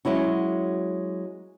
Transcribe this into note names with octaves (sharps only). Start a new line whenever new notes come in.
F#3 G#3 C#4 E4 F#4